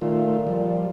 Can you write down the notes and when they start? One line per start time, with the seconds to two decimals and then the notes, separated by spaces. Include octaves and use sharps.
0.01 A#2 D#3 A3 F4
0.47 F3 G3